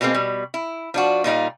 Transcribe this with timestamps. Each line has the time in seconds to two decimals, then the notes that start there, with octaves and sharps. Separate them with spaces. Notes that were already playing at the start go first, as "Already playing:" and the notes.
0.01 B2 G3 G#3 A#3 C4
0.14 B2 G3
0.54 E4
0.94 F3 D4 F#4
1.24 A#2 G3 D#4 F5